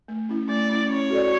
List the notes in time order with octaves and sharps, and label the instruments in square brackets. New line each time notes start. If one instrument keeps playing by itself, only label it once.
[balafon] A3
C#4 E4
[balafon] A3 [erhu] D5
[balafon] C#4 E4
[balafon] C#4 [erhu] C#5
[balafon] F#4 A4 D5